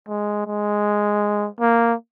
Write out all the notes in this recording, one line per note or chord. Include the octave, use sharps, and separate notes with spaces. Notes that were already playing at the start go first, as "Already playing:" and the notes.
G#3
G#3
A#3